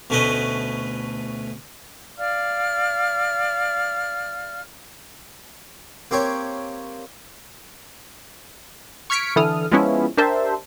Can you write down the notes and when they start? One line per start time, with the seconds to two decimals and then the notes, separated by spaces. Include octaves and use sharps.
0.10 D2 B2 A3 C#4 B4 D#5
2.18 D5 F5 F6
6.11 A#3 C4 G4 C#5
9.10 C#6 F6 G#6 B6 C#7 D7
9.36 D3 E3 E4 A4 D#6 F6
9.72 F3 G#3 B3 C#4 E4
10.17 D4 G4 A#4 C5 E5 A5